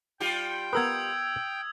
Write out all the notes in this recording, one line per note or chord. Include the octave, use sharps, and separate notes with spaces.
G3 F4 G4 G5
B3 A#4 B4 D#6 E6 G#6